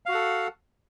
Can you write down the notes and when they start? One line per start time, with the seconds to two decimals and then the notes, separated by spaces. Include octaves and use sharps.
0.06 F5
0.09 F#4
0.12 F#5
0.15 A4